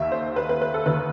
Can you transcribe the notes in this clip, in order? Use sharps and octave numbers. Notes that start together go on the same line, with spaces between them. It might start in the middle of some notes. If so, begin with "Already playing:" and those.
Already playing: D#2 D#3 E5
C5
B4
B4
B4
A4
D#2 D#3 B4